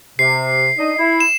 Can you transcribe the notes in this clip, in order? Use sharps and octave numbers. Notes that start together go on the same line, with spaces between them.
C3 C7
D4 D#4 D#5
E4
E7